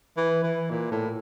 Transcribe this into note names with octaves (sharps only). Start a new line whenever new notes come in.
E3
E3
A#2
A2